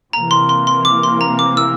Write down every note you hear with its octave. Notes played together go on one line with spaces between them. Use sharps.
C3 E3 A#3 A#5
C6
C6
C6
D6
C6
A#5
D6
E6